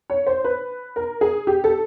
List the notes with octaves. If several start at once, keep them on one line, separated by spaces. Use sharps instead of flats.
C#5
C5
B4
A#4
G#4
G4
A4